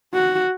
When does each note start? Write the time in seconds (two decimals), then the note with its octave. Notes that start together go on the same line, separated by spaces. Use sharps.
0.14 F#4